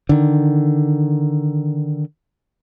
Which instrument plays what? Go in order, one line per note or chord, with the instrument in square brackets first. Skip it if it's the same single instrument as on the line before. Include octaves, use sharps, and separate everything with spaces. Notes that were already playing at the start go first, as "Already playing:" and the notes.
[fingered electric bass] D3 D#3